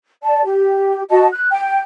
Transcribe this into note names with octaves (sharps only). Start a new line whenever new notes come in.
D5 A5
G4
F#4 D#5 A5
F#6
G5